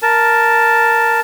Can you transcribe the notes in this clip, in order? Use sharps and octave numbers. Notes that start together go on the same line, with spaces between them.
A#4 A5